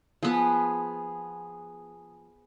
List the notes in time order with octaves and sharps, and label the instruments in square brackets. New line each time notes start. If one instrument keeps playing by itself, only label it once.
[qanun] F3 B3 [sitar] G#4